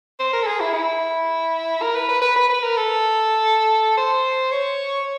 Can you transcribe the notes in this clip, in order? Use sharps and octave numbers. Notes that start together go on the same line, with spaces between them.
C5
A#4
A4
G#4
E4
E4
A#4
B4
B4
B4
B4
B4
A#4
A4
C5
C#5